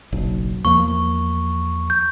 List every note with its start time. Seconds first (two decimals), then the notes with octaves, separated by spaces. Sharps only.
0.12 F#1 B1
0.65 E2 F3 A#3 C#6
1.90 G6